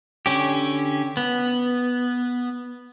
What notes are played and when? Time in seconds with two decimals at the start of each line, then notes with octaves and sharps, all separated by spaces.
0.26 D3 C#4 G4
1.17 B3